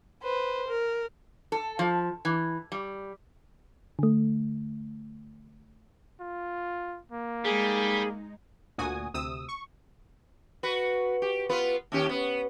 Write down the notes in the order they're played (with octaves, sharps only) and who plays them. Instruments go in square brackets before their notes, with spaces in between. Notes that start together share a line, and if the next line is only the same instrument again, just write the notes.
[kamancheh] B4 C5
A#4
[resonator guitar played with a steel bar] A4
F3
E3
G3
[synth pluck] D3 A3
[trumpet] F4
A#3
[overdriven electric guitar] G3 [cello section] G#3 D#4 [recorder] G#4
[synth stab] D2 A#2 F#4 G#5 D#6
D2 C3 D#6 E6
C#6
[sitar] F#4 B4
G4
B3 F4 B4
D#2 C#4 G4
B3